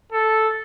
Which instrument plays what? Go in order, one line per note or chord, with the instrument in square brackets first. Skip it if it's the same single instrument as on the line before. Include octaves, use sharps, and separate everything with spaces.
[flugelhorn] A4